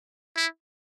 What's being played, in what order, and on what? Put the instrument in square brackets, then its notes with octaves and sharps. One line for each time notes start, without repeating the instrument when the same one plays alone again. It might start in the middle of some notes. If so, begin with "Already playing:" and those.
[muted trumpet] E4